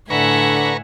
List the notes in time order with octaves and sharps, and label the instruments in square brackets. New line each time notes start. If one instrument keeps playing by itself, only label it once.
[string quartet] A2 G#5 [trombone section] D3 [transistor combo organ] B4 A#5 C#6 [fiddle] E5 F#5